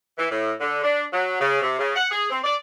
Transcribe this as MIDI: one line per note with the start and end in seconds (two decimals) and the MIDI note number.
0.18 0.26 52
0.30 0.52 45
0.60 0.81 50
0.83 1.04 62
1.12 1.36 54
1.39 1.61 49
1.62 1.77 48
1.79 1.95 49
1.96 2.07 78
2.11 2.26 68
2.30 2.39 60
2.44 2.55 74